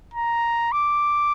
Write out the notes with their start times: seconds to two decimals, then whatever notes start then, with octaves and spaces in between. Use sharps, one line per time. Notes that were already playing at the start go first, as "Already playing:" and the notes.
0.14 A#5
0.72 D6